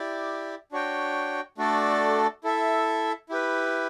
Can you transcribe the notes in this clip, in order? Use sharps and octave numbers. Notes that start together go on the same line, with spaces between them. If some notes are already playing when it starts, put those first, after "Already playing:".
Already playing: E4 G4 D5
D4 F#4 C#5 G5
A3 D4 F#4 A4 D5
E4 A4 E5
E4 G4 B4